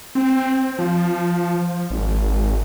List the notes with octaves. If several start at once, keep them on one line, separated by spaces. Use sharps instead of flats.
C4
F3
G#1